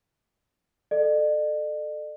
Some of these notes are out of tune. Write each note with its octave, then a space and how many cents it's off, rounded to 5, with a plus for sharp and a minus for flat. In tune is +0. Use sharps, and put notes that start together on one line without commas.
A4 +0 D5 +45